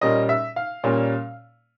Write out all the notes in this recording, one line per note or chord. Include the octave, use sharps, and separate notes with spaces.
A#2 G3 A#3 C#4 D#5
E5
F5
A#2 G3 A#3 C#4